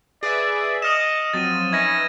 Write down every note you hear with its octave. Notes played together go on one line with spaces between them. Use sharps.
G#4 B4 D5 E5
D#5 D#6 F6 A6 C#7 E7
F3 F#3 C4 A6 D#7
C#4 D#4 B4 E5 G#6 A#6 D#7